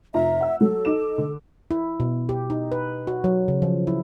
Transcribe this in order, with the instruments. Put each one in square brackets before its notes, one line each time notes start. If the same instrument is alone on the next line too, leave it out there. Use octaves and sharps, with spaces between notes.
[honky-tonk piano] F1 F4 A#5 [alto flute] E5
[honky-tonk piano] F#5 E6
[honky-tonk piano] F#3 [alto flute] A4
[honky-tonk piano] D#4 D6 E7
D3
[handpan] E4
B2
G4
D#4
B4
F#4
F#3
C#3
F3
E4